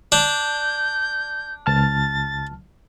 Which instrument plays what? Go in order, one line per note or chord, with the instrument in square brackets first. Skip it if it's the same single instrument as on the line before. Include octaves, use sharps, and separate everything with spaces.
[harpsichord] D4 [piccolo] G6
[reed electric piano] C#2 A5 F6 [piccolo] A6